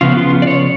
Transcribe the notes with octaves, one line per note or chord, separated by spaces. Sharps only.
C#3 F3 B3 F4
F4
D5
C#5